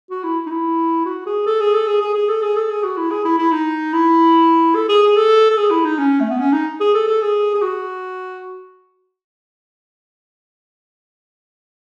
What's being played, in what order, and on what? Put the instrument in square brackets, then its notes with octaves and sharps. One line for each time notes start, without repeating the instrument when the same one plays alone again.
[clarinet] F#4
E4
D#4
E4
F#4
G#4
A4
G#4
A4
G#4
G#4
G#4
A4
G#4
A4
G#4
F#4
E4
G#4
E4
E4
D#4
E4
A4
G#4
G#4
A4
A4
G#4
E4
D#4
C#4
A3
B3
C#4
D#4
G#4
A4
A4
G#4
G#4
F#4